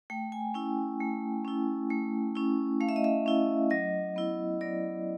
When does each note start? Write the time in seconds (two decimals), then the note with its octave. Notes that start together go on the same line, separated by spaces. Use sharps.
0.10 A3 G5
0.32 G#5
0.54 C#4 E4 G5
1.00 A3
1.45 C#4 E4
1.90 A3
2.35 C#4 E4
2.81 A3 F5
2.89 E5
2.96 D#5
3.04 E5
3.26 C#4 E4
3.71 F#3 D#5
4.16 B3 E4
4.61 F#3 D5